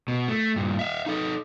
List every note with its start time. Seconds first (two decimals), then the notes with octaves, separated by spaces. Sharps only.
0.08 B2
0.28 A3
0.56 G2 A#2
0.79 E5 F5
1.06 D#4 A4